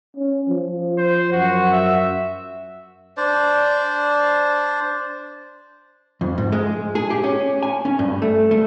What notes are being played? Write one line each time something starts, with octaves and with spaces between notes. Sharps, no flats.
C#4
F3
C5
F#2 F#4
E5
D4 C5 D5
F2
G#2
G#3
G#4
G4
C#4
G#5
C#4
G2
A3
A3